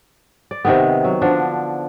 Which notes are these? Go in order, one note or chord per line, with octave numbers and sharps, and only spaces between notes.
D5
C3 D#3 B3
F#3
D3 F3 D4